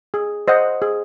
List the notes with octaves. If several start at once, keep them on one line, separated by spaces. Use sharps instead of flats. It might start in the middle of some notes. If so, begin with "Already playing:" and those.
G#4
C5 D#5 F#5
G#4